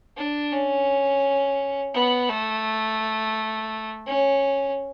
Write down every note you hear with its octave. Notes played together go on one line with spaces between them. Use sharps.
D4
C#4
B3
A3
C#4